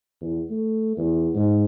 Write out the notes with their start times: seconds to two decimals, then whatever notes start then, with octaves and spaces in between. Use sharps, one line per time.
0.21 E2
0.50 A3
0.97 E2
1.35 G#2